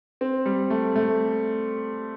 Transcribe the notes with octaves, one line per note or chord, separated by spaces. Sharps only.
C4
G3
A3
A3